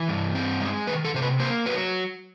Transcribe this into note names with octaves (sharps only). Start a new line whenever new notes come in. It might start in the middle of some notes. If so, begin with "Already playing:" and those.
Already playing: E3
G2
C4
G#3
D#3 B4
A4
C3 C5
B4
A#3 C5
F#3 B4